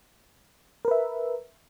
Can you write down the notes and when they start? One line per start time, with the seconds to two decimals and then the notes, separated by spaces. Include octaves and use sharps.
0.85 A#4
0.88 B4
0.91 E5